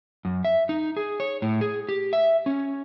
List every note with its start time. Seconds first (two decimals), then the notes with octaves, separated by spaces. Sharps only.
0.25 F#2
0.45 E5
0.69 D#4
0.97 G#4
1.20 C#5
1.42 A2
1.61 G#4
1.89 G4
2.13 E5
2.46 C#4